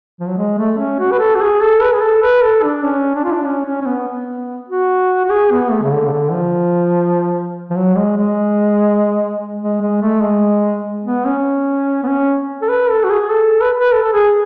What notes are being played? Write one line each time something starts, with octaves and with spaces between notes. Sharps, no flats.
F3
F#3
G#3
A3
C#4
F#4
B4
A4
F#4
G#4
A4
B4
G#4
A4
B4
A4
D4
C#4
D4
F4
D4
C#4
C#4
C#4
B3
B3
F#4
F#4
G#4
B3
A3
C#3
D3
C#3
D3
F3
F3
F#3
G#3
G#3
G#3
G#3
A3
G#3
B3
C#4
B3
C#4
A4
B4
A4
F#4
G#4
A4
B4
B4
A4
A4
G#4